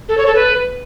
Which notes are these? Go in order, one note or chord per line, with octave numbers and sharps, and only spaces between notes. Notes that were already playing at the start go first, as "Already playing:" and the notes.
A4
C#5
A4
B4